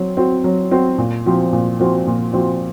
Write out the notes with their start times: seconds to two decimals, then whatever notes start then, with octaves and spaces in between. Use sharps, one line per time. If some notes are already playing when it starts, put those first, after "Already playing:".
Already playing: F#3 C4
0.17 C4 F#4
0.44 F#3
0.71 C4 F#4
0.98 A#2
1.26 F3 C4 F#4
1.53 A#2
1.79 F3 C4 F#4
2.07 A#2
2.33 F3 C4 F#4